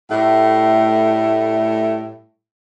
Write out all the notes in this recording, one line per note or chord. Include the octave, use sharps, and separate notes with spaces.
A2 G3 A3